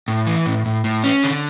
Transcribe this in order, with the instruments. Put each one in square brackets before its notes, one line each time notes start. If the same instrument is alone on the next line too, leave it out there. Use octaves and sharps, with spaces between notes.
[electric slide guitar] A2
E3
A2
A2
A2
C#4
D3